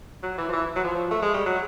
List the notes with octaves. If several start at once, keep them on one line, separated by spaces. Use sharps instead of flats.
F#3
E3
F3
E3
F#3
F3
A3
G#3
G3
F#3